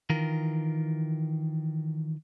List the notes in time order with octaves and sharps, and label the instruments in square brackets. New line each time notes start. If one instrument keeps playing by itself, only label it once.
[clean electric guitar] D#3 E3 F4 A#4